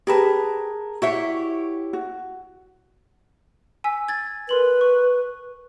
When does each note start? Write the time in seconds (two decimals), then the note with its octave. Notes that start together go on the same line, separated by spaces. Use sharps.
0.07 G4 G#4 A#4 B4 A5
1.02 E4 F#4 G4 C#5 E5
1.93 F#4
3.84 G#5 E6 B6
4.08 G#6 A6
4.49 A#4 B4 C6 F#7
4.81 C#6